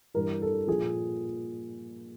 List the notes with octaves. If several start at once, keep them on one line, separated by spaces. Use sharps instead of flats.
G2 E3 A#4
A4
A#2 F3 G#4